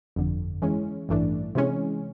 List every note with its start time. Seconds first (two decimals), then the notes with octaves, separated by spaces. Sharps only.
0.16 G1 F2 D3
0.62 E3 G#3 C#4
1.09 A1 G2 E3 A3 D4
1.55 C3 E3 G#3 C#4